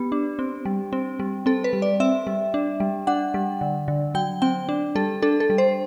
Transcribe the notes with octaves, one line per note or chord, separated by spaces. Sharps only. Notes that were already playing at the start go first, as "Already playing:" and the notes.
Already playing: B3 G4
D4
C4
G3
C4
G3
C4 A4
B4
G3
D5
C4 E5
G3
D4
G3
D4 F#5
G3
D3
D3
F#3 G5
C4 G5
D4
G3 A4
D4 A4
A4
G3
C5